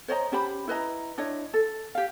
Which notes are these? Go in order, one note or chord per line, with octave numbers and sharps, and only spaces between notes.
C5 C#5 D#5 A#5
C#4 G4 C5 B5
E4 B4 D#5 A#5
D4 E4 C#5 D#5
A4
G4 F5